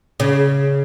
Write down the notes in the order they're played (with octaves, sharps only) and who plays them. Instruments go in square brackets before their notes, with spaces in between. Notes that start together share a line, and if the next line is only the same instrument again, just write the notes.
[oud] C#3